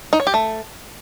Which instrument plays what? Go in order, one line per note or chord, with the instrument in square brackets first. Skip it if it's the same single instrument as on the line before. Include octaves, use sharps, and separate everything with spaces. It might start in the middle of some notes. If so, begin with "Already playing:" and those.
[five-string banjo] D#4
C#5
G4
A3